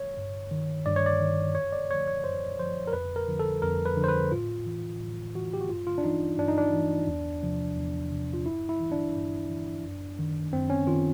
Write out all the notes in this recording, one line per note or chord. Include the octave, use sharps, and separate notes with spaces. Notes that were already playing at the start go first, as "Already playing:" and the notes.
Already playing: C#5
G2
D#3
G2 D5
C#5
D5
D#3
F#2 C#5
D5
D3 F3 C#5
C#5
F#2 C5
D3 F3 C5
A#4
F2 B4
A#4
D3 F3
A4
F2 A#4
B4
D3 F3
C5
B4
A2 F4
E3
A2
E3 F#4
G4
F#4
G2 F4
F4
D4
E3 D#4
G2 D4
D#4
D4
E3
E2
C3 F3
E2
C3 F3
F4
G2 E4
E4
E3
D4
G2
E3
F#2
D#3
F#2 C4
C#4
D#3 F4